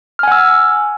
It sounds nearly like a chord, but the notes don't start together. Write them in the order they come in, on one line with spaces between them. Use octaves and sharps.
F6 G#5 F#5 E6